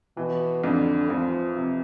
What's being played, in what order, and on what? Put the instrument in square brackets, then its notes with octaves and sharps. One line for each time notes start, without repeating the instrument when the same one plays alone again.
[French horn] B2 [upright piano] E3
[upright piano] F2 [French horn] D3
[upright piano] F2 [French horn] F3
[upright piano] C3